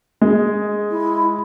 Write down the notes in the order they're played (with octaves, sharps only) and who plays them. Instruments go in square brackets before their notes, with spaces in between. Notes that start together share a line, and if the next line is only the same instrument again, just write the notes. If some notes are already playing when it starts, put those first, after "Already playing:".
[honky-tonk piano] G#3
[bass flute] E4